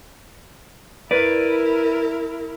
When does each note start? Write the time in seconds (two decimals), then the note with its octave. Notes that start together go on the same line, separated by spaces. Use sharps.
1.11 E4 A#4 B4 D5